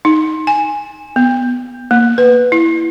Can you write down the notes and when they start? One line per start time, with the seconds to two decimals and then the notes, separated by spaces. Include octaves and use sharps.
0.05 D#4
0.47 G#5
1.16 B3
1.91 A#3
2.18 B4
2.52 E4